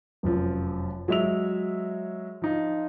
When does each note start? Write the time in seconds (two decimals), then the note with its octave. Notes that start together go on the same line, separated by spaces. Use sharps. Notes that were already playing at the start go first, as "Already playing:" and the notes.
0.23 F1 F#2 F3
1.08 F#3 G#3 E5 E6 F7
2.42 F3 D#4 F4